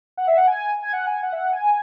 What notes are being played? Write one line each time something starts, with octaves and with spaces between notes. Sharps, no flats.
F#5
E5
F#5
G#5
G#5
F#5
G#5
F#5
E5
F#5
G#5